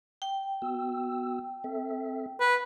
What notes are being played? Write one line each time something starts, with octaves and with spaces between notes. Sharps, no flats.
G5
B3 F#4 E6
C4 A4 E5
B4 F#5